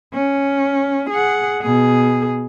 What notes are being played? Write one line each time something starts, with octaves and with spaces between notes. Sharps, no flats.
C#4
G#4 F#5
B2 G#4